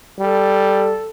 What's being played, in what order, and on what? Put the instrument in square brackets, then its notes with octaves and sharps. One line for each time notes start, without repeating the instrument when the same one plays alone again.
[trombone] G3 [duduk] A4